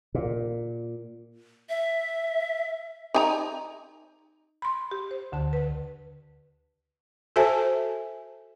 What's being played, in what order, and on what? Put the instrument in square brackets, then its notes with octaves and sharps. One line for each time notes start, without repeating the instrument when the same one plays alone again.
[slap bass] A#2
[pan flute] E5
[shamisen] D#4 G#5 A#5
[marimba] B5 C6
G4
C5
D2 D3 A5
B4
[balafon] F#4 A4 C5 E5 G#5 A5